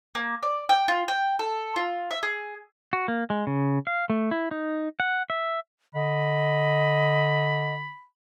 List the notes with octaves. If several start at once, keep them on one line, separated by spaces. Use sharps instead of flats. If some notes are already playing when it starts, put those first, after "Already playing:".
A#3
D5
G5
F4
G5
A4
F4
E5
G#4
F#4
A#3
G#3
C#3
F5
A3
E4
D#4
F#5
E5
D3 D#5 B5